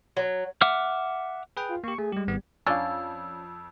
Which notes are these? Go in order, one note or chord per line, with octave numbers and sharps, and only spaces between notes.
F#3
E5 F#5 D6 F6
G#4 B4 G5
F4
A#3 G4 C#6
A3 G#4
G3 G#3 G4
G#1 B3
F2 C#4 D4 D5 F5 E6